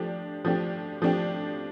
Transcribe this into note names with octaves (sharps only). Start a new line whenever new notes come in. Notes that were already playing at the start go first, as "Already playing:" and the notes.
Already playing: F3 A3 D4 G4
F3 A3 D4 G4
F3 A3 D4 G4